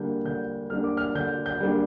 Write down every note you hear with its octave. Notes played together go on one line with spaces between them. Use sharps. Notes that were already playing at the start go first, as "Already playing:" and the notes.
Already playing: D3 G3 A#3 D4 G6
D3 G6
G3 A#3 D4 F6
D6
F6
D3 G6
G6
G3 A#3 D4